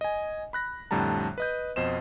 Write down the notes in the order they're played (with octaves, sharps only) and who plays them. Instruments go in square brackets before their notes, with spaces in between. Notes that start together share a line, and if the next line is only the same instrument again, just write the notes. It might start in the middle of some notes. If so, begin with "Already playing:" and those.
[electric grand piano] D#5 G#5
B5 F#6 A#6
F2 A2 D3 G3 A5 A#5
B4 D#5 G6
F2 B2 C5 D#5 E7